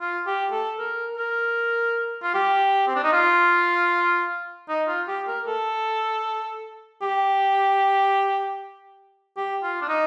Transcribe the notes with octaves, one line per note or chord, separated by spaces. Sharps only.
F4
G4
A4
A#4
A#4
F4
G4
C4
D4
D#4
F4
D#4
F4
G4
A#4
A4
G4
G4
F4
D4
D#4